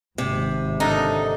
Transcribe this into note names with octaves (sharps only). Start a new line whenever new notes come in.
G#1 C3
D3 D#4 A4 A#4